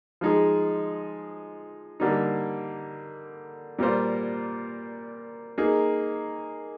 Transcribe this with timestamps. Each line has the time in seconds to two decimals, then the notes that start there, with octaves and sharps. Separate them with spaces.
0.21 F3 G#3 D#4 G#4
2.00 D3 G3 A#3 D#4
3.79 A#2 G3 A#3 F4 C5
5.58 A#3 D#4 G#4